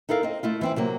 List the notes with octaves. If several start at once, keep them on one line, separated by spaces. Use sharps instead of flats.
D#4 E4 A4 A#4 F5
C4 D#5
A3 E4 F4
E3 C4 E4
C3 F#3 A#3